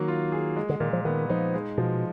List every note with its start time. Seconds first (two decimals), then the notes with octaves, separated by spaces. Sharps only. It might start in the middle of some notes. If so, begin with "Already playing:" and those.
Already playing: D#3 F#3 A#3
0.08 F4
0.32 G#4
0.57 G#3
0.69 D3
0.80 A#2 D#3
0.93 F3
1.05 D#3 B3
1.30 F3 D#4
1.54 G#3
1.78 B2 F3